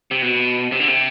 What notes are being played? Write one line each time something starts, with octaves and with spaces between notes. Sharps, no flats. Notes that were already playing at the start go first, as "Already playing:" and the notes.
C3
B2
C3
D3
C3